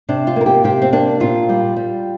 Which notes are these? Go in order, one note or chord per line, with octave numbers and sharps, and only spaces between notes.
C3 D4
F4
A#3 A#4
G4
C3 G4
C4
A#3 D4
A#2 F4
G3
G3